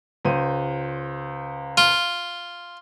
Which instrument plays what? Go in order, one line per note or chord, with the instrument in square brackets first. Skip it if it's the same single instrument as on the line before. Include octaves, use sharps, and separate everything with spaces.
[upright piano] C#2 C5 D#7
[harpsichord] F4